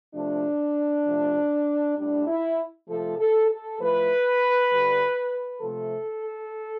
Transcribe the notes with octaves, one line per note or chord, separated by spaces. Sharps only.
C3 F3 A3 D4
C3 F3 A3
A2 G3 D4
E4
C3 F3 A3 A4
A4
A4
A2 F3 A3 B4
D3 G3
C3 F3 A3 A4